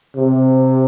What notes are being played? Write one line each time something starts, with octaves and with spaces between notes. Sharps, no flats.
C3